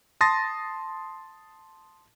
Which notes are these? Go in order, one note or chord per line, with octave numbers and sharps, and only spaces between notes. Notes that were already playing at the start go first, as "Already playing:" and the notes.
A5 C6 D#6 A6 A#6